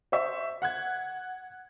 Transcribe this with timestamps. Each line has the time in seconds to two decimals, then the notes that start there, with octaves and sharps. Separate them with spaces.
0.12 C5 E5 C#6
0.62 F#5 F#6 G#6